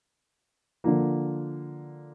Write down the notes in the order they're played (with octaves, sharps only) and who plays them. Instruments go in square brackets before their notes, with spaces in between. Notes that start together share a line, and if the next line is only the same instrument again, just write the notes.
[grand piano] D3 F3 A#3